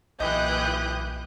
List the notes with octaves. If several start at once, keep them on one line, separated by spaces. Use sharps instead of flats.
B1 A#2 E3 G4 D#5 D#6 F#6 G6